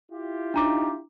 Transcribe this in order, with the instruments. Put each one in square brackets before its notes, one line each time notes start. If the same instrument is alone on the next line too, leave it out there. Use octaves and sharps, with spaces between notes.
[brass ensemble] E4 F4 G4
[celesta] D4 A#5 D6 [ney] D#4